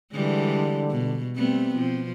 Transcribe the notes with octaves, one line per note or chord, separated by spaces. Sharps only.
D3 E3 G3 G#3
B2
G3 A3 B3 C4
B2 F3